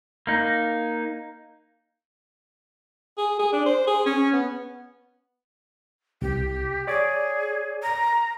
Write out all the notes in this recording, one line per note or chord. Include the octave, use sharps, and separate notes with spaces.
A#3 D#4
G#4
G#4
D4
C5
G#4
C#4
B3
C2 G4
G#4 C#5 D5 D6
A#5